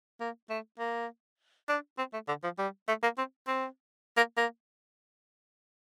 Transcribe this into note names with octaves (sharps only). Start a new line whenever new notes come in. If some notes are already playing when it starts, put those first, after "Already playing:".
A#3
A3
A#3
D4
C4
A3
D3
F3
G3
A3
A#3
C4
C4
A#3
A#3